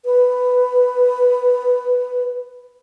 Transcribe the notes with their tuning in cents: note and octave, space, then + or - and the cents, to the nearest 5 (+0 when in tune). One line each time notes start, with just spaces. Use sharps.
B4 +10